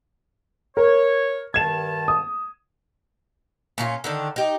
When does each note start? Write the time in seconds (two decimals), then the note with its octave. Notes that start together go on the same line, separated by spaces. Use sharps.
0.77 A#4 C#5
1.54 G2 D#3 A5 G#6 E7
2.08 D#6
3.78 A#2 C#4 F4
4.04 D3 D#3 D4
4.36 D#4 G4